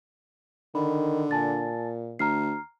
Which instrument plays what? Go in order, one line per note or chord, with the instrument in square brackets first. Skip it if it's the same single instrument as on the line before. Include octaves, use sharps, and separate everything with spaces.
[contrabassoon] D3 [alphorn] D#3 [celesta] B5
[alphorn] A#2 [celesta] G#5 A5 A6
[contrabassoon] D2 [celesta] A#5 F6 C7